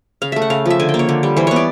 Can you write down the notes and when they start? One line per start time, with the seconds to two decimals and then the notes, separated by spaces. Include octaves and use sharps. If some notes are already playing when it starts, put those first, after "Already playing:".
0.22 C#3 F5
0.32 A3 E5
0.42 F#5
0.50 C#3 F5
0.66 F3 E5
0.79 D3 G#5
0.89 G5
0.94 A#3
0.99 C#5
1.09 D3
1.23 G3
1.37 E3 C5
1.47 B3 C#5
1.56 D5